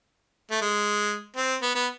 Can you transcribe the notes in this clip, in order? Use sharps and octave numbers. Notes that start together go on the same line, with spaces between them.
A3
G#3
C4
B3
B3